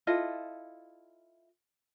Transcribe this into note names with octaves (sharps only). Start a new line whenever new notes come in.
E4 F4 A4 D#5